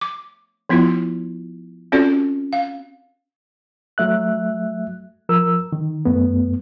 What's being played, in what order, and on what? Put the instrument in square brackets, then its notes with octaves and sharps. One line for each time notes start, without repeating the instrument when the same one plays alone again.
[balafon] D6
F3 B3 E4 F4
C4 C#4 F4 F#4 A4 D5
F5
[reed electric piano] F#3 A3 E5 F#6
F3 A#4 E6
D#3
F#2 A3 B3